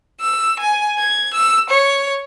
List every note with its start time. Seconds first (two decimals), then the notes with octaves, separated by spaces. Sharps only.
0.20 E6
0.61 G#5
0.98 G#6
1.34 E6
1.69 C#5